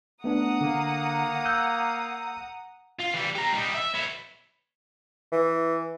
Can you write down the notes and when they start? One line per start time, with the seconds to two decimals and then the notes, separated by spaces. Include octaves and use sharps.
0.24 A3 B3 D4 F#5 A#5 D#6
0.61 D3 A#3
1.45 E6 F#6 G6
2.99 F4
3.14 E3 G3
3.35 G4 A#5
3.53 G3 D#4
3.74 E5
3.94 B4 C#5
5.32 E3